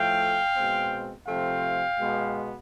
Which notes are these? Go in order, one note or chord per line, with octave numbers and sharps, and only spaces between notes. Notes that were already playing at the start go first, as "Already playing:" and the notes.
Already playing: A2 F3 A3 F5 G5
B2 G#3 C4
C3 F3 A3 C4 F5 G5
B2 G#3 B3